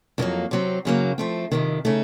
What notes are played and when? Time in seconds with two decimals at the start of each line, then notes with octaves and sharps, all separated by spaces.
0.18 F2 D#3 F#3 A#3
0.51 C3 F#3 C4
0.85 F#2 C#3 F#3 A#3
1.18 F3 A3 C4
1.52 F2 C3 D#3
1.85 C#3 A3 D#4